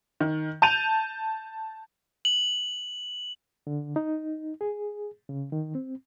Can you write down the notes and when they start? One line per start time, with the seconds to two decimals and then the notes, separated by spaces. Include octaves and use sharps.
0.20 D#3
0.62 A5 G6 D#7 F7
2.25 F#7
3.67 D3
3.96 D#4
4.61 G#4
5.29 C#3
5.52 D#3
5.75 C4